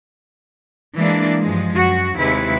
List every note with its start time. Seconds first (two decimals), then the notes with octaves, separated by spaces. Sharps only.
0.97 E3 G#3 A#3 D4
1.41 G2 F3 G#3
1.74 F#2 F#4
2.17 D#2 C3 G#3 E4 B4